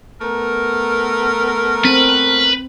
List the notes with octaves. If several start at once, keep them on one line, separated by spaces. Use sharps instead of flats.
A3 B3 A#4
C4 B4